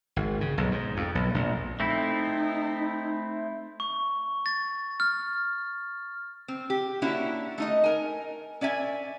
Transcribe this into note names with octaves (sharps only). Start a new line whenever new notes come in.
G#1
C#3
B1
G#2
F2
B1
A#1
A3 C4 D#4 E4
C#6
A6
F6
C4
G4
A#3 C#4 D4 E4 F#4
A3 D#4 D#5
A#4 G#5
C#4 D5 E5 G#5